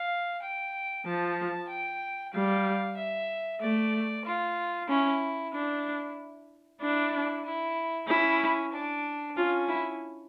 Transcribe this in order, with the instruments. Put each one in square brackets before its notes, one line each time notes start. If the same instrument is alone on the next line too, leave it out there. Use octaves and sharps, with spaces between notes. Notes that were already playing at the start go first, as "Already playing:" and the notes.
Already playing: [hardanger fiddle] F5
G5
[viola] F3 [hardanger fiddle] A5
[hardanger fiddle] G5
[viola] G3 [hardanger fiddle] F5
[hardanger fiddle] E5
[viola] A3 [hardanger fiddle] D5
[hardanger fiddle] F4
[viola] C#4 [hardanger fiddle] E4
[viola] D4 [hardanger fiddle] E4
[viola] D4 [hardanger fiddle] E4
[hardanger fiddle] E4
[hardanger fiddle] C#4 [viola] E4
[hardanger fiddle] D4
[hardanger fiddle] C#4 [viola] F4
[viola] E4